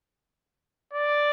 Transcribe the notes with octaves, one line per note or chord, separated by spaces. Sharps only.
D5